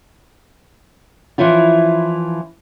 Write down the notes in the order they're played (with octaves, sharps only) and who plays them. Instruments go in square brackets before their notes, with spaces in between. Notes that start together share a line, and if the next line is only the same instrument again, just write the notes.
[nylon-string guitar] E3 F3 C#4 E4 F4